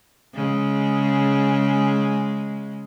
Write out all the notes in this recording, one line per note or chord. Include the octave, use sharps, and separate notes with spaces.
C#3 G#3